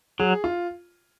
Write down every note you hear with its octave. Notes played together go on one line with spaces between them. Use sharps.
F#3 G#4
F4